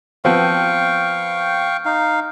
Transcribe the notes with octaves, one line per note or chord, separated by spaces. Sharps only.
F3 B3 C4 F5 G5 C#6
D#4 F5